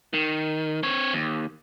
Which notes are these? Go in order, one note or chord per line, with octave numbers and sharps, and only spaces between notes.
D#3
C4 C#5
D#2